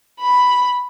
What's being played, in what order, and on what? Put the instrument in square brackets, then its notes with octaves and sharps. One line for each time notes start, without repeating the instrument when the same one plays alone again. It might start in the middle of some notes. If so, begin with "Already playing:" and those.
[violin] B5